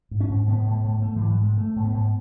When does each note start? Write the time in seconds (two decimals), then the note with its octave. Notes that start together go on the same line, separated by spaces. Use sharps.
0.11 G#2
0.20 C#4
0.29 G#2
0.48 G#2 B3
0.66 G#2
0.84 G#2
1.02 G#2 A3
1.16 G#2 E3
1.30 F#3
1.39 G#2 G#3
1.57 G#2 A3
1.76 G#2
1.84 B3
1.93 G#2